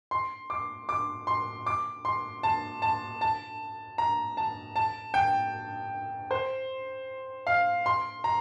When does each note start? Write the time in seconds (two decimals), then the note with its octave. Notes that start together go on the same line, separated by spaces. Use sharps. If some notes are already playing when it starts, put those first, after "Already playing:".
0.11 C6
0.50 D6
0.89 D6
1.27 C6
1.66 D6
2.05 C6
2.43 A5
2.82 A5
3.21 A5
3.98 A#5
4.37 A5
4.76 A5
5.14 G5
6.31 C5
7.47 F5
7.86 C6
8.24 A#5